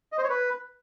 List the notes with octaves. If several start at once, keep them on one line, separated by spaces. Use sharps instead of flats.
D#5
C5
C#5
B4